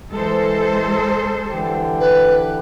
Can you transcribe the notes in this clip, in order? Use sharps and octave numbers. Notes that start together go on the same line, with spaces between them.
E3 G#3 A4 C5
D3 E3 G4
B4